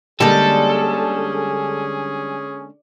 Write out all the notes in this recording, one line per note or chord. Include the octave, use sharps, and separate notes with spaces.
D3 G3 G#3 A#3 C#4 G#4 A4